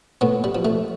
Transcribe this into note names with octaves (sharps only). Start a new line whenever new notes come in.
A2 B3
G3
F3
A3